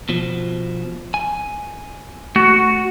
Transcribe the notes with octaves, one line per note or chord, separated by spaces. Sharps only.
B2 F3
G#5
A3 F#4